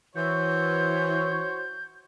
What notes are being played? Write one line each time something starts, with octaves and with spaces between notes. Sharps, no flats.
E3 F#4 C5 C#5 G6